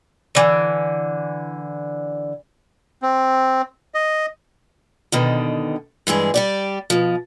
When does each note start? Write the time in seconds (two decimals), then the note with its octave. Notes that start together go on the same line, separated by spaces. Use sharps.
0.35 D3 E3
3.02 C4
3.94 D#5
5.12 B2 D3 D#3
6.07 G2 E3 G#3 G#4
6.34 G3 G4 D5
6.90 B2 F3